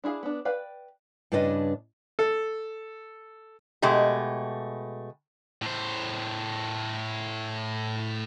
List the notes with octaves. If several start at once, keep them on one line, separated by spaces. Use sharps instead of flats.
D4 E4 G#4 F5
B3 D4
B4 D5 F5 G5
G2 C#3 D4 B4 D#5
A4
B2 G#3 A3 G4
A2 C5